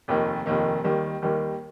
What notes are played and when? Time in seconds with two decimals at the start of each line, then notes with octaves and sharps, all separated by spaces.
0.08 F1 D#2 D#3 A#3
0.46 F1 D#2 D#3 A#3
0.84 D#2 D#3 G3 A#3
1.22 D#2 D#3 G3 A#3